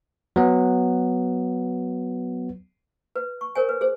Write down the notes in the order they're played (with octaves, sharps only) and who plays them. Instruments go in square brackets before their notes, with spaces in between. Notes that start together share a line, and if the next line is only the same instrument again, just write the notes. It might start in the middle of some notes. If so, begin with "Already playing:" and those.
[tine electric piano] F#3 B3
[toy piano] B4
C#6
A#4 C5 C#5 G#5
B4
G#4 C5